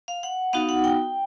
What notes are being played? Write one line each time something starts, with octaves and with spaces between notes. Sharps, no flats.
F5
F#5
B3 D#4 F#4 F5
F#5
G5